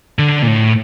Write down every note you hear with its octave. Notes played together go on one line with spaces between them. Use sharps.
D3
A#2
A2